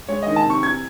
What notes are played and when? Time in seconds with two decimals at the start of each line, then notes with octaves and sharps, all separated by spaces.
0.09 G#3 C#5
0.23 D#3 D#5
0.36 A5
0.45 C3 C#6
0.63 E3 G#6